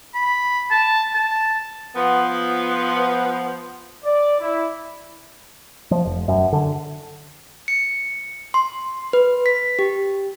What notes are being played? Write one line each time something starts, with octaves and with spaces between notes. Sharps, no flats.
B5
A5
A5
F3 B3
D5
E4
F3
F1
F#2
D3
C#7
C6
B4
B6
G4